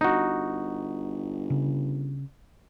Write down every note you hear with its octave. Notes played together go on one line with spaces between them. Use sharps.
G1 D#4 F#4
C#3